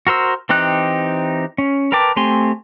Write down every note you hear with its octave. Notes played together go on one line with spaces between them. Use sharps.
F#4 A#4 C5 E6
E3 C4 D#4 G4 F#6
C#4
A#4 B4 G5 A5 D6
A3 C4 G4 G#5 C6